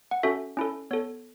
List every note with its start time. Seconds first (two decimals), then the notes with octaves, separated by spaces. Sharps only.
0.11 F#5
0.23 C#4 F#4 A4 E5
0.57 C#4 E4 A4
0.91 B3 A4 C#5